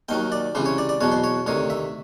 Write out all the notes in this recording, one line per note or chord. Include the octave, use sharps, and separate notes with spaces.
D#2 D#3 F#3 G5
D5
C#2 C3 E3 C5
C#5
D5
D5
E2 B2 F#3 C#5
C5
C#5
D2 C3 D#3 C#5
E5